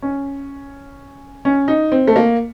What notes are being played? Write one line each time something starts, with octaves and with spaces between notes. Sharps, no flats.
C#4
C#4
D#4
C4
A3
A#3